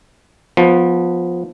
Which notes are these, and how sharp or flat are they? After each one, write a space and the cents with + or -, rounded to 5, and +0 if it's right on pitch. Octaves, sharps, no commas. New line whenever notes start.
F3 +15 B3 +0